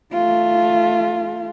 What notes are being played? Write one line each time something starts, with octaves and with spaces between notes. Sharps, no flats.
A3 F4